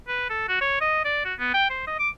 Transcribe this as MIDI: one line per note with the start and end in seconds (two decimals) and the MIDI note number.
0.08 0.28 71
0.30 0.44 69
0.49 0.61 66
0.61 0.80 73
0.81 1.03 75
1.05 1.21 74
1.25 1.34 66
1.39 1.51 59
1.54 1.69 79
1.70 1.83 72
1.87 1.97 75
1.99 2.09 86